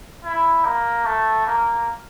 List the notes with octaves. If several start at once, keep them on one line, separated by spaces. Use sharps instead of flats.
E4
A#3
A3
A#3